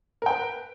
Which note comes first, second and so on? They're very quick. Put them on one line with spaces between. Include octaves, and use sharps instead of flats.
A#4 G5 B4